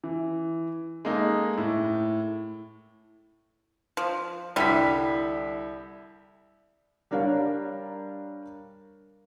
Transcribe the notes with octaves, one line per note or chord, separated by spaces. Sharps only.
E3
G#3 A#3 D#4 A4
A2
F3
C2 D3 G3 E4 B6
G3 D4 A#4 C#5 F5